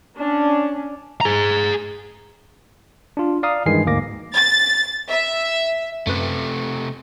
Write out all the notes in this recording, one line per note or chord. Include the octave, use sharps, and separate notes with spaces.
C#4 D4
G#4 A#5
D4 F4
D5 F5 A#5 D#6
G2 D#3 E3 G#3 G#5 C7
D2 G#2 A#3 D6 A#6
A6
E5
F#2 C3 A3 B4